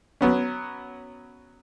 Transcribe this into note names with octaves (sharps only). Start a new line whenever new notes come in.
F#3 B3 C#4